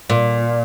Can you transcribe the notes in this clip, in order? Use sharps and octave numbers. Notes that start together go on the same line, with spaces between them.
A#2